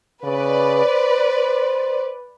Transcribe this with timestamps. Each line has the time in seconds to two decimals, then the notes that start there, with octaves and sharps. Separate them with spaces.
0.24 C#3 B4 D5
0.85 C5